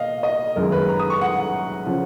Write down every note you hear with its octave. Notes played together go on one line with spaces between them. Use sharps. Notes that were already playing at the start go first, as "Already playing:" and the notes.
Already playing: B2 A#3 D#5 F5
D#5
F#1 F#2 D#3 G#3 A#4
B4
A#5
D#6
C#6
F#5
C#3 F3